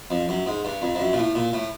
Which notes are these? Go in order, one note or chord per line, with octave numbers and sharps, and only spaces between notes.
F2
F#2
G#2
G2
F2
F2
F#2
A#2
A2
A#2
A2